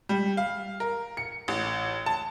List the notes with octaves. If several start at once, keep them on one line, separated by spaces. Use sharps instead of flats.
G3
F5
A#4
C#7
A1
A5